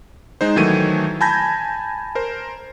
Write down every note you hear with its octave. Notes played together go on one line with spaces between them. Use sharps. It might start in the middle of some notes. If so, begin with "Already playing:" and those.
G#3 D#4 C5
D#3 E3 F#3 A3 G#6 D#7
G#5 A5 B5 G6 G#6 A#6
A#4 C5